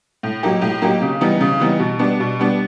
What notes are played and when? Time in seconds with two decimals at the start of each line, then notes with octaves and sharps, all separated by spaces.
0.23 A2
0.43 F#3 A#3 D#4 G4
0.62 A2
0.82 F#3 A#3 D#4 G4
1.02 C#3
1.21 E3 G3 B3 D#4
1.41 C#3
1.60 E3 G3 B3 D#4
1.80 B2
1.99 G3 B3 D4
2.20 B2
2.39 G3 B3 D4